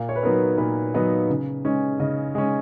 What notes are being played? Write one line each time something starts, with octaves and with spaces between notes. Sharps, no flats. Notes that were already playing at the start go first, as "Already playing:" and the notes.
Already playing: A#2 F5
C#5
B4
F#3 B3 D#4 A#4
A#2 B4
F#3 B3 D#4
C#3
G#3 C#4
C#3 D#5
G#3 C#4